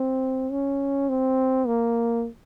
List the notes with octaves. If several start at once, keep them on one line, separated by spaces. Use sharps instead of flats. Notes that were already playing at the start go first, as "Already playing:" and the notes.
Already playing: C4
C#4
C4
A#3